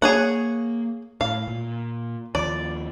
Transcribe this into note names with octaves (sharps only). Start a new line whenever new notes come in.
A#3 G#4 C#5 F#5
A2 F5
A#2
D#2 F3 D5